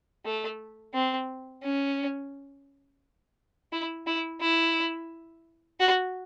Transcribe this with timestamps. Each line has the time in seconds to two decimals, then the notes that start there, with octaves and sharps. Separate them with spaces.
0.25 A3
0.94 C4
1.63 C#4
3.72 E4
4.07 E4
4.41 E4
5.80 F#4